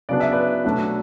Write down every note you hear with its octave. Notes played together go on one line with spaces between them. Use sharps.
C#3 F#3 B3 D4 D5
E5
B4 D5
B2 F#3 A3 D4